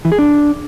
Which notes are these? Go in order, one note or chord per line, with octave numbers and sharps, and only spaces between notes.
E3
G#4
D4